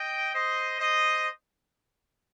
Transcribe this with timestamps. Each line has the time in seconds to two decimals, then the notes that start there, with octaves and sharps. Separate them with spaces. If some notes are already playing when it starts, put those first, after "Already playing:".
Already playing: D#5 G5
0.33 C5 D#5
0.79 C5 D#5